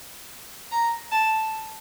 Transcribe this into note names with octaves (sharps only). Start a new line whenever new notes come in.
A#5
A5